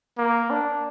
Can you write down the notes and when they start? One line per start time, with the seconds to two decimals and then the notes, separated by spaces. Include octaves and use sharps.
0.18 A#3
0.50 D4